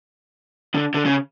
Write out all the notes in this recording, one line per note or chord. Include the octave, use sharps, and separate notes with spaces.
D3
D3
C#3